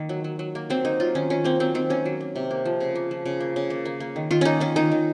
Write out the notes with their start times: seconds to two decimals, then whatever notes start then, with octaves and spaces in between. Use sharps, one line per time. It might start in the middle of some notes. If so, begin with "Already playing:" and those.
Already playing: D#3 A#3
0.09 F#3
0.24 F#3
0.39 F#3
0.55 A#3
0.70 F#3 C4
0.85 A#3 D#4
1.00 F#3 F4
1.15 D#3 C#4
1.30 D#3 C#4
1.44 A#3 C4
1.60 F#3 C4
1.75 D#3 C4
1.90 A#3 C#4
2.06 F#3
2.21 A#3
2.36 C3
2.51 A#3
2.65 F3
2.81 C#3
2.95 A#3
3.11 F3
3.26 C#3
3.40 A#3
3.56 C#3
3.70 A#3
3.85 A#3
4.00 A#3
4.16 D#3
4.31 D#3 F4
4.41 A#3 C#4 D#4
4.60 D#3 C#4
4.76 D#3 D#4
4.91 D#3